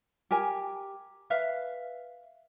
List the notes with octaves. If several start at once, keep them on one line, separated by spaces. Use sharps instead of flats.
G4 A#4 G#5
B4 E5 F5